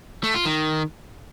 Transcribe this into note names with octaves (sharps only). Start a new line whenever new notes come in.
A3
F4
D#3